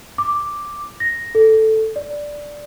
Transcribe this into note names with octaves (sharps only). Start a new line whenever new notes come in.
D6
A#6
A4
D5